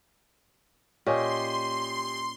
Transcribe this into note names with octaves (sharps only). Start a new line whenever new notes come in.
A#2 C#4 G4 D#5 G#5 C6